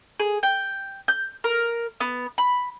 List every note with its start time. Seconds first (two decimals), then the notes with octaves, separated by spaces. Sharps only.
0.20 G#4
0.43 G5
1.08 G6
1.44 A#4
2.00 B3
2.38 B5